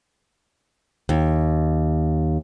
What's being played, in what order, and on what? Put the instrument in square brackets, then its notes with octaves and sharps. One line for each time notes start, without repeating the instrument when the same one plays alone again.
[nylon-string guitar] D#2